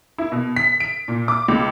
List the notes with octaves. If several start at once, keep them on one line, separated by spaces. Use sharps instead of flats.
E4
B2
B6
D7
A#2
D6
C#2